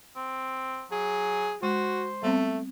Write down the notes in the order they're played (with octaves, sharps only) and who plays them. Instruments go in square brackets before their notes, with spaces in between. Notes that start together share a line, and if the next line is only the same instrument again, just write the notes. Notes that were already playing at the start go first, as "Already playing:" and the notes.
[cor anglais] C4
[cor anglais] F#3 [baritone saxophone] G#4
[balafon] G#3 C#6 [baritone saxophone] F#4 [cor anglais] C5
[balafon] G3 B3 C4 [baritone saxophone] A3